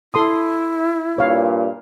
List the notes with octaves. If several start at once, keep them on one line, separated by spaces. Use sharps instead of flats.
E4 A4 C6 D#6
G2 A#2 C#5 F5